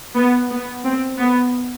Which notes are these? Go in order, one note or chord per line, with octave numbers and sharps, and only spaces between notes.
B3
B3
C4
B3